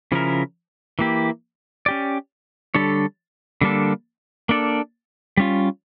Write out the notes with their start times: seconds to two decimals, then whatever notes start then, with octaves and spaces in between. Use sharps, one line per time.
0.12 C#3 F3 C#4 E4 A#4
0.99 E3 A#3 E4 G4
1.86 C#4 G4 D5
2.75 D3 G3 D4 A4 C#5
3.61 D3 G3 A#3 D4 A4
4.49 A#3 D4 A4 D5
5.37 G3 C#4 F4